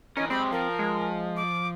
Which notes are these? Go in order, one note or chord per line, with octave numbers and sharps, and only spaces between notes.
E3 C#4 A#4 D#5
G#3 C4 G4 B5
F3 A#4
G#3
D6